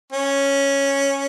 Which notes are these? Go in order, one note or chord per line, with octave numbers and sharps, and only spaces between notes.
C#4